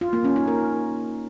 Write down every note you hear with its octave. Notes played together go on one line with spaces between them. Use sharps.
F4
A#3
C#4
D#4
A#4